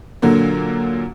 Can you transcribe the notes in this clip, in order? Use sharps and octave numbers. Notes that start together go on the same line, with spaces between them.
A#2 D3 F#3 A#3